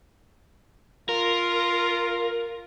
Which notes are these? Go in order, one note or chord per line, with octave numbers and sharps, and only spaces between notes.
F4 A#4